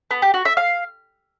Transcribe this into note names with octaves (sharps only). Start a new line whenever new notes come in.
B3
G4
F#4
E5
F5